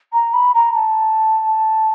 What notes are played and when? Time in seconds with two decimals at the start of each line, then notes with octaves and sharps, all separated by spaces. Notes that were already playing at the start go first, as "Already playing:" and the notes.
0.13 A#5
0.33 B5
0.54 A#5
0.74 A5